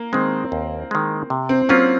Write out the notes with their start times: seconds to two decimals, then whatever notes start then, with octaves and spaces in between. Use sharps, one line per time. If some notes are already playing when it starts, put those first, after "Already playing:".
Already playing: A#3
0.13 D#3 G#3 C4
0.52 D#2
0.91 D#3 G#3
1.30 C3
1.49 C4
1.69 F#3 A#3 C4 C#4 F4